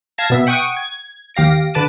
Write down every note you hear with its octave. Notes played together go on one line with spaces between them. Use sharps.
F5 A5 G#6 A#6
B2 B3 E5
F#5 G5 C#6 D#6 D7 D#7
G#6
D#2 G4 F5 A#6 D7
D3 B4 A5 D6 D#7